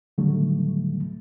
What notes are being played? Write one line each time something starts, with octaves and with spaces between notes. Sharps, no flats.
A2 D3 D#3 F#3 G3 A3